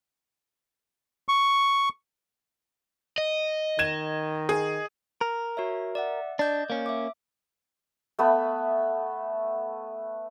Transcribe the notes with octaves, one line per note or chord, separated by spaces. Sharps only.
C#6
D#5
D#3 G#6 E7
G#4
A#4
F#4 C#5 E5
D5 E5 F#5
D4 D5 D#5 G6
A#3 C#4
E5 D6
A3 B3 B4 B5